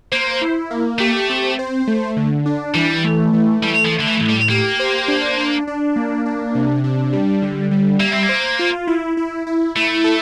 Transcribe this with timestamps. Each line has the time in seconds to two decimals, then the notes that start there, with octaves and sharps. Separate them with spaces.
0.12 A#3 C5
0.41 E4
0.71 A#3
0.99 A3 G4
1.30 C4
1.59 C5
1.87 A3
2.17 D3
2.46 D4
2.74 E3 G3
3.04 A3
3.33 E3
3.62 G3 A3
3.85 F3
3.92 A3
4.00 D3
4.07 E3
4.21 A2
4.29 G3
4.49 A#3 G4
4.80 C5
5.08 D4
5.37 D4
5.67 D4
5.96 A#3
6.26 D4
6.55 C3
6.84 D4
7.13 G3
7.42 D3
7.71 G3
8.00 A#3 E5
8.13 C4
8.23 A#3
8.29 C5
8.59 F4
8.87 E4
9.17 E4
9.47 E4
9.76 A3 E4
10.04 A4